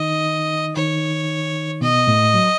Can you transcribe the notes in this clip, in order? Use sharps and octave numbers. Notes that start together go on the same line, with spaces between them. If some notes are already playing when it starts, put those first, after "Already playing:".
Already playing: D#3 D#4 D#5
D#3 D#4 C#5
B2 B3 D#5
A2 A3
F#3